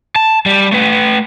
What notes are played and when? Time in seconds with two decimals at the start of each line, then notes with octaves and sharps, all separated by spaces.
0.16 A5
0.46 G3
0.72 A3 B4